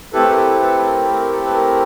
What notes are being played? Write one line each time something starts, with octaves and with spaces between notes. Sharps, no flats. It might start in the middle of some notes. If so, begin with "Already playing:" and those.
A3 C4 E4 G4 A4 B4
A#4
A4 B4
A4 B4
B4
A#4
A#4
A4
B4
A#4